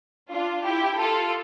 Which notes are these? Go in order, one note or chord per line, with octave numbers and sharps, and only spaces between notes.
D4 F4
E4 G4
F4 A4